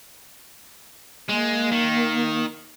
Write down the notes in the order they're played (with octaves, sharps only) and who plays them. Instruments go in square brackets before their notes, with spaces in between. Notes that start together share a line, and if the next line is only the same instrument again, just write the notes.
[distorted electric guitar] G#3 [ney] A#3
[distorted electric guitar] D#3